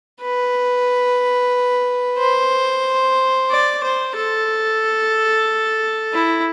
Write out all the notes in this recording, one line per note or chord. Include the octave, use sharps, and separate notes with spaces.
B4
C5
D5
C5
A4
E4